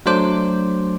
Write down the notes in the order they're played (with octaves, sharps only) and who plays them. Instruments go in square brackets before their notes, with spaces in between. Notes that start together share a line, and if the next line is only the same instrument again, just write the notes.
[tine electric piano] F#3 A3 D4 C5 D6